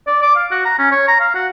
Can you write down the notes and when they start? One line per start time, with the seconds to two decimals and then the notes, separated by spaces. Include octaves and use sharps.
0.07 D5
0.22 D6
0.36 F5
0.51 F#4
0.65 A#5
0.78 C#4
0.92 C#5
1.08 A#5
1.20 F5
1.35 F#4